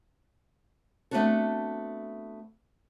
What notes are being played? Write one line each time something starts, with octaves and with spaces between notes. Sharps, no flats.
A3 B3 C4 D4 F#4 A4